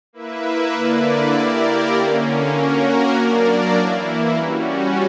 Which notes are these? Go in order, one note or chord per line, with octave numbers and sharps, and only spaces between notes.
A#3 E4 B4 E5
D3 A#3 E4 B4 D5
A#3 E4 G4 A#4 D5
D3 A#3 C#4
A#3 C#4 F#4 A#4
F#3 A#3 D4 A#4 D5
E3 A#3 E4
G3 C#4 F#4